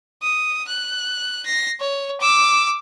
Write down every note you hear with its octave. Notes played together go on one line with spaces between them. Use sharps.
D#6
F#6
A#6 C7
C#5
D6 E6